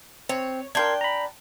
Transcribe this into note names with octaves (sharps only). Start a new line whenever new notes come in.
C4 C#5
D4 A#4 G5 C6 G#6
A#5 B5